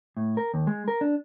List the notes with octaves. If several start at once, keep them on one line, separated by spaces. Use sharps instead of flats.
A2
A#4
D#2
G#3
A#4
D4